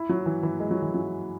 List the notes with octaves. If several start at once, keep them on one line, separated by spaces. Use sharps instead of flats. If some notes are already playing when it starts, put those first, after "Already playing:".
Already playing: E4
F#3
E3
E3
G#3
F#3
E3
F#3